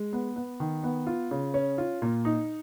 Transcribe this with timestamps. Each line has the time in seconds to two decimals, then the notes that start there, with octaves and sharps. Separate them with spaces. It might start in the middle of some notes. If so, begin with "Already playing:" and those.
Already playing: G#3
0.13 B3
0.36 B3
0.60 D#3
0.84 B3
1.07 F4
1.31 C#3
1.54 C#4
1.78 F4
2.02 A#2
2.25 D#4